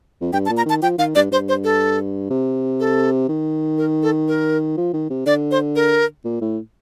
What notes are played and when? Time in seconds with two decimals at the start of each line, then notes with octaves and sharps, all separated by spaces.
0.21 F2
0.33 G2 G5
0.46 A5
0.50 A#2
0.57 A#5
0.66 D#3 A5
0.82 F3 G5
0.98 D#3 F5
1.15 G2 D5
1.31 G2 C5
1.49 C5
1.64 A4
2.30 C3
2.80 A4
3.29 D#3
3.78 A#4
4.03 A4
4.28 A#4
4.77 F3
4.93 D#3
5.10 C3
5.26 D3 D5
5.51 C5
5.76 A#4
6.25 A#2
6.41 A2